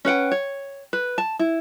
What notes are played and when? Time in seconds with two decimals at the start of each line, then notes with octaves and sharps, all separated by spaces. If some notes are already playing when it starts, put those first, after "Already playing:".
0.05 C#4 B4 F#5 G5
0.31 C#5
0.93 B4
1.18 A5
1.39 E4